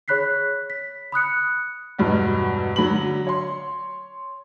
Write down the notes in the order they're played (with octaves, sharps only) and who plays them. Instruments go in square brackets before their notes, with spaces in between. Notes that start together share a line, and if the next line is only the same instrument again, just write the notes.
[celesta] G#4 C#5 B5 F#6 B6 C7
B6
B5 D#6 F#6 C#7
[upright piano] E2 G2 B2 F#3 G#3
D3 F#3 B5 F#7
C#5 C6